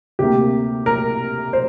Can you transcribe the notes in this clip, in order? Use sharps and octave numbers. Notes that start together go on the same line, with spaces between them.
D2 C3 A#3 G4
A#4
C5